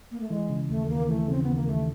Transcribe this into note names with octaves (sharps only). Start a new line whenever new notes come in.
A#3
A3
E3 G#3
C#3
D#2 A3
D#2 A#3
E3 A3
C#3 C4
D#2 B3
A#3
D#2 A3